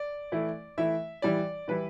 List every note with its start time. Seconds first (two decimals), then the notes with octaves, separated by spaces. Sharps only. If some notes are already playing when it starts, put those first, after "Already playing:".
Already playing: D5
0.32 E3 A3 E4
0.77 E3 A3 E4 E5
1.22 E3 G3 E4 D5
1.68 E3 G3 E4 B4